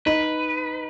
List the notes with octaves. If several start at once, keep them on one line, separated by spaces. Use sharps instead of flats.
D#4 B4